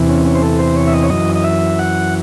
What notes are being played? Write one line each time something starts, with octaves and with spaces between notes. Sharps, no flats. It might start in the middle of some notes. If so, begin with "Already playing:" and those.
Already playing: E2 C3 E3
C#4
C#4
C5
A4
C5
C#5
E5
D#5
C#5
F#2 E3 D#5
D#5
E5
F#5